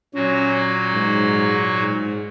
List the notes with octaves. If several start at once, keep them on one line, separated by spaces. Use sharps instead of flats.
A#2 F#3 C#4 F#4
G#2
G#2